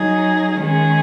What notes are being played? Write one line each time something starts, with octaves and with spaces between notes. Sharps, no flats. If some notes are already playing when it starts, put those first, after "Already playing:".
Already playing: F#3 D#4 G#4
D#3 G#3 C#4 G#4